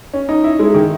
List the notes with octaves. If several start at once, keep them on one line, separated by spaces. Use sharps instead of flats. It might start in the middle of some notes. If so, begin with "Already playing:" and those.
C#4
D#4
E4
G#3
D#3